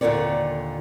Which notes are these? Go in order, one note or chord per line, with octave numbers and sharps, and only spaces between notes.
D#2 A#2 D3 A#4 C#5 D5